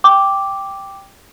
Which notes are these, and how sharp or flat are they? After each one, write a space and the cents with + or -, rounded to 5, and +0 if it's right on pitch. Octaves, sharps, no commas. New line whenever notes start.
G5 +0 D6 +0